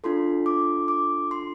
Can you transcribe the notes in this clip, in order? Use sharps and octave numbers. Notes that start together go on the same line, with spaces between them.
D4 F4 A4 C6
D6
D6
C6